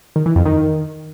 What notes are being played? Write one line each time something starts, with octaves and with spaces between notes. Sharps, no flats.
D#3
E3
F2
D#3